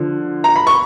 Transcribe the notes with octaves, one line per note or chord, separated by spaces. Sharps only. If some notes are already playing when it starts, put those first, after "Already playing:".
Already playing: D3 F3
A#5
B5
C#6